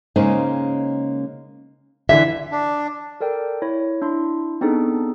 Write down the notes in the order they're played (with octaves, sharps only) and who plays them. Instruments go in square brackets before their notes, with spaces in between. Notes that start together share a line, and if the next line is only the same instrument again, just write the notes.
[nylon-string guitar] C#3 G#3 A#3 C#4 D#4 C5
[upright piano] D3 E3 [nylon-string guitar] E5
[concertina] D4
[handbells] A4 A#4 D5 G5
E4 C#5
D4 E4 C6
B3 C4 D4 D#4 G#4 A4